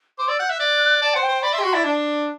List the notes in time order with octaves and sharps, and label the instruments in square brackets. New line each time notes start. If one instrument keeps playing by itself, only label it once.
[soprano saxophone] C5 [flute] D6
[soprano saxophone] D5 [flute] E6
[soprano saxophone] F#5 [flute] G6
[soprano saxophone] E5 [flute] F#6
[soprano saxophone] D5
[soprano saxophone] D5 [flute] A5
[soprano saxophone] C5 [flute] F#5
[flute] G5
[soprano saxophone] C5
[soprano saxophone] D5 [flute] B5
[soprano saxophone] E5 [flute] C6
[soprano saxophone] G4
[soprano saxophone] F#4 [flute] C6
[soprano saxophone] E4 [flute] D5
[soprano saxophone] D4